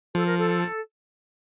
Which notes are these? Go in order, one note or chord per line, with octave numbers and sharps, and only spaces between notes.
F3 A4
A#4
A4